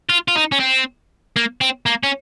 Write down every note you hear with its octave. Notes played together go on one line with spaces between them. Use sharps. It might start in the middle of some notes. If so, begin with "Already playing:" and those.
F4
F4
D#4
C#4
C4
A#3
C4
A#3
C#4